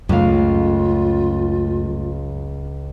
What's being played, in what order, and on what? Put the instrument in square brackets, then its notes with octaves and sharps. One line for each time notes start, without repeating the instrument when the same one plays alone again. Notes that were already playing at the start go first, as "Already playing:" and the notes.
[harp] C#2 F5 [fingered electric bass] F#2 A3 [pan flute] F4